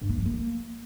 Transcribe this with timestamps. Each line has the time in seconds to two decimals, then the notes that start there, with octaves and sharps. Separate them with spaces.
0.01 G2
0.09 A#3
0.18 F3
0.26 A#3